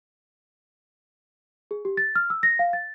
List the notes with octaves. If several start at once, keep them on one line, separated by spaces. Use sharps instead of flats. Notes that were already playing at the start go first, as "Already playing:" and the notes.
G#4
G4
A6
F6
E6
A#6
F5
A6